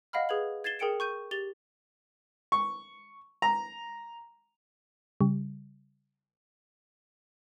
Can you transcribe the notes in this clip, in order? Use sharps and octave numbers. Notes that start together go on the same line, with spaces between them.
D#5 F5 F#5 B5 F6
G#4 B4 G#6 F#7
G#6 A6 C7 E7 G7
G#4 A#4 G5 C#7 D7 E7
C#6 G6 D#7
G4 A6 F7 G7
C#6
A#5
C#3 G3